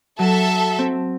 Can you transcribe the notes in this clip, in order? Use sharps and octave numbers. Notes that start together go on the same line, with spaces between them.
F#3 A4 E5
C4